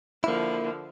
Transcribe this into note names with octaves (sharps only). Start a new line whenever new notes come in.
D3 F3 A#3 E4